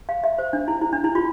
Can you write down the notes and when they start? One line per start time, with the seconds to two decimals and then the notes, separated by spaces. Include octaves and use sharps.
0.09 F5
0.24 E5
0.38 C5
0.53 D4
0.68 E4
0.81 E4
0.93 D4
1.04 E4
1.15 F4